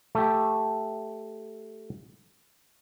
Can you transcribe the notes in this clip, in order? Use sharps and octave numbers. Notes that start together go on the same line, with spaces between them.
A3 G4